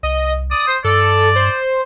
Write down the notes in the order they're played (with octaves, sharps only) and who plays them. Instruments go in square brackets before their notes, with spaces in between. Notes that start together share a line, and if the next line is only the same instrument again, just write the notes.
[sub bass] C2 [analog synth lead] D#5
[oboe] D5 [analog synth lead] D#6
[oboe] C5
[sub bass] G2 [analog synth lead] A4 [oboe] D5
[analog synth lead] C5